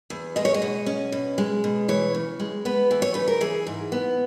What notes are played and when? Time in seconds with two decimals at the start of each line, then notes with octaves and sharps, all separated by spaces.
0.10 E2
0.36 G#3 D#5
0.45 C#5
0.54 D#5
0.62 B2
0.86 C#4
1.12 B2
1.38 G#3
1.64 B2
1.88 E3 C#5
2.15 C#3
2.40 G#3
2.65 B3 B4
2.91 E3
3.02 C#5
3.14 C#3 B4
3.28 A#4
3.41 E3 G#4
3.67 G#2
3.92 B3